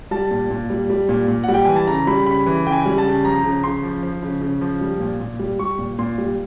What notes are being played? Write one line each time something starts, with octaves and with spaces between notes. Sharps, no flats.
G3 A5
A#2
A#2
G3
G3
A#2
A#2
G3 F#5
G5
E3 G#5
A5
C#3 A#5
G3 B5
C#3 B5
E3
C#3 G5
G#5
G3
A5
C#3
F3 A#5
C#3
C#3 C6
F3
F3
C#3
C#3
F3
G3
A#2
A#2
G3
G3 C#6
A#2
A#2 C6
G3